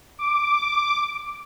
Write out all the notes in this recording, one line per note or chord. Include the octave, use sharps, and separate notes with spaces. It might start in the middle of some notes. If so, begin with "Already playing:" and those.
D6